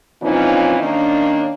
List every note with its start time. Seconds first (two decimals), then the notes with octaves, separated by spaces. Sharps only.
0.22 A#2 E3 F3 C4 C#4 D#4
0.79 D#3 A#3 C#4 D4